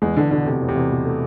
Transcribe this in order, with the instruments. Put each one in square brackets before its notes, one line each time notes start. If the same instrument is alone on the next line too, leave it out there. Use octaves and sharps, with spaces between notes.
[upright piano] E2 [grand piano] G#3
[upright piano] E2 [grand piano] D3
[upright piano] B2 [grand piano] D3
[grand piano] C3 [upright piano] A3
[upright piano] E2
[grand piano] C3
[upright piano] E2
B2
A3